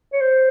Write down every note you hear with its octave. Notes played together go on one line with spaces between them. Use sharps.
C#5
C5